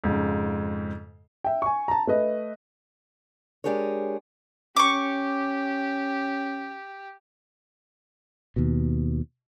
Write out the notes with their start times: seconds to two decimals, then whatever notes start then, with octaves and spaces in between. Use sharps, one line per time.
0.04 F2 G#2 C#3
1.44 E5 G5
1.62 G#5 C#6
1.88 A5 A#5
2.07 A3 B4 D#5
3.64 G#3 D4 G4 G#4 A#4 C#5
4.77 C#4 G4 C#6 D6
8.56 D#2 B2